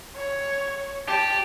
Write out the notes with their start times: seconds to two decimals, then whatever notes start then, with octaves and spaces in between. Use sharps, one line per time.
0.16 C#5
1.09 G4 A5